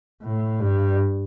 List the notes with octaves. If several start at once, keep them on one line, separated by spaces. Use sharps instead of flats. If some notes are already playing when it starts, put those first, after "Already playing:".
A2
G2